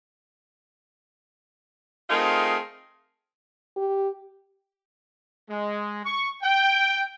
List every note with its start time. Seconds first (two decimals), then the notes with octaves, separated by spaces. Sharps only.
2.10 A3 C4 D#4 F4 G#4 A#4
3.77 G4
5.51 G#3
6.05 C#6
6.43 G5